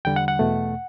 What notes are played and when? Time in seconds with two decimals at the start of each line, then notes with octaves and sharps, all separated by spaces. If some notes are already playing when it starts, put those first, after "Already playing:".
0.05 E2 D3 G3 G5
0.16 F#5
0.28 F#5
0.39 E2 B2 A3